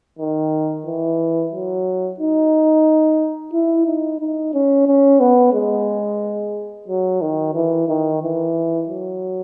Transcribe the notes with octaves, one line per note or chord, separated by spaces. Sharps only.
D#3
E3
F#3
D#4
E4
D#4
D#4
C#4
C#4
B3
G#3
F#3
D#3
E3
D#3
E3
F#3